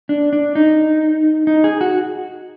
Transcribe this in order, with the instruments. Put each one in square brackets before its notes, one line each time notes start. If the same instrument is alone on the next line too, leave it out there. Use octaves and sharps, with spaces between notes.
[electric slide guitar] D4
D4
D#4
D#4
G#4
F#4